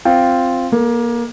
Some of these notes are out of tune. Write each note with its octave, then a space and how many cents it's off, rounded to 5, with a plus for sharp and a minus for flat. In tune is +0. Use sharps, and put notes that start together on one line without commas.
C4 +0 F4 +0 G5 +0
A#3 +25 A4 +0